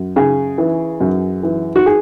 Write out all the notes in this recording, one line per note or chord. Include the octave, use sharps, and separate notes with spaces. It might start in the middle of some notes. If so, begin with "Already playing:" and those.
Already playing: F#2
C#3 G#4
E3
F#2
E3
F#4
G#4